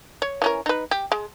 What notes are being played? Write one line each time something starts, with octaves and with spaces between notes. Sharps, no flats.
C#5
E3 C#4 A#4
D#4 B4
G4
G#3